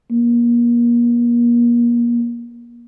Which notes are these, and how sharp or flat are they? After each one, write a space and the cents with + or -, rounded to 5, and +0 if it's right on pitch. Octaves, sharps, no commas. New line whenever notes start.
A#3 +35